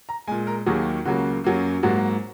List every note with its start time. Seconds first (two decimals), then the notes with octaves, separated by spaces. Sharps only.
0.09 A#5
0.28 A#2 G#3 G#5
0.47 A#4
0.66 D#2 D#3 F#3 A#3 G#4
1.05 C#2 C#3 F#3 A#3 F#4
1.44 F#2 F#3 A#3
1.83 G#2 F#3 A#3 F#4